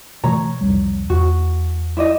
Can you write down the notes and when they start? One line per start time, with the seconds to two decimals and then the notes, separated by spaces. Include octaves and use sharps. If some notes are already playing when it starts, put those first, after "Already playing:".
0.24 B2 E3 A3 C#5 A#5
0.61 C2 F2 G3
1.10 E2 F#4
1.97 E4 D5 D#5